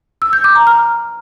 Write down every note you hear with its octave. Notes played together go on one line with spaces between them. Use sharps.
E6
G6
D6
A#5
F6